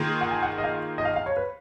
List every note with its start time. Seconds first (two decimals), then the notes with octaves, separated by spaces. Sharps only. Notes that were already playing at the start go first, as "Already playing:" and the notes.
Already playing: D#3 A#3 F4 G#4
0.21 F#5
0.31 G#5
0.43 F#5
0.58 D#5
0.64 F5
0.98 D#5
1.05 F5
1.16 F5
1.26 C#5
1.37 B4